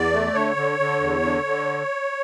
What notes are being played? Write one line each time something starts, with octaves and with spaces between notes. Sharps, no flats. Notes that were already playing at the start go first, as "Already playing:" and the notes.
Already playing: E2 D5
A3
D3 C#5
D3
D3
E2
D3
D3